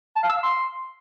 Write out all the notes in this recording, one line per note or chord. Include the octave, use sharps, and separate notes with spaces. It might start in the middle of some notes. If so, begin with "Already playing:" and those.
A5
F5
E6
F5
C6